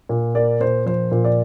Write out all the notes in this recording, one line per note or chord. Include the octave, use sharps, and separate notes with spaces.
A#2
A#3 D5
A#2 C5
F3 C5
A#2
D5